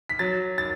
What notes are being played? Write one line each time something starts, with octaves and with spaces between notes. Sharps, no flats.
B6
F#3 A6
A6